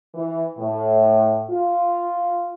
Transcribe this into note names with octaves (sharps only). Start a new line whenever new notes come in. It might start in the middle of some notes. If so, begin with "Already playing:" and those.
E3
A2
F4